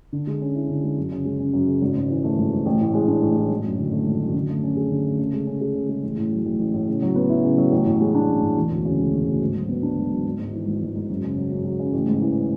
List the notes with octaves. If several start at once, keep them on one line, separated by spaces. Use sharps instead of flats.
D3
G#3
C#4
E4
D3
G#3
F#2
C#3
G#3
C#4
F#2
C#3
G#1
G#2
E3
A3
G#1
G#2
A1
A2
G#3
D4
A1
A2
G#1
F#2
D3
A3
G#1
F#2
D3
A3
C#4
G#4
D3
A3
C#3
G#3
C#4
G#4
C#3
G#3
A1
A2
F#3
A1
A1
A2
C#3
F#3
B3
E4
C#3
F#3
A1
A2
G#3
D4
A1
A2
E1
D2
C#3
G#3
E1
D2
G#2
F#3
B3
D4
G#2
F#3
G#1
G#2
E3
G#1
G#1
G#2
F#2
C#3
F#3
F#2
F#2
C#3
A1
G#2
E3